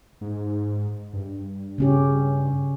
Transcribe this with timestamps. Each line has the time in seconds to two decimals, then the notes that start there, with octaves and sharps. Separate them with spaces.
0.21 G#2
1.13 G2
1.78 C#3 C#4 G4